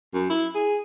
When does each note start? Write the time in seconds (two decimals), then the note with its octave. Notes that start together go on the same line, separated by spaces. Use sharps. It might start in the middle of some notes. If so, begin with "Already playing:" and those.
0.14 F#2
0.30 E4
0.55 G#4